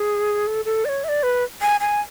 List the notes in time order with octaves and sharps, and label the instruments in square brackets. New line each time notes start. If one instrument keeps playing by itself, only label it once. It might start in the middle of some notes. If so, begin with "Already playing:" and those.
Already playing: [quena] G#4
A4
A4
D5
C#5
E5
D5
B4
G#5
G#5